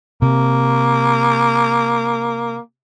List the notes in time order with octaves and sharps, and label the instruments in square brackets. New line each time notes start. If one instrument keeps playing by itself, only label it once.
[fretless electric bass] C3 [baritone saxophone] A#3